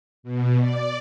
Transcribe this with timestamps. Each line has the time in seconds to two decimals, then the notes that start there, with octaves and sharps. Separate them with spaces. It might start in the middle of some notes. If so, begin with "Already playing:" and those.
0.23 B2
0.59 D5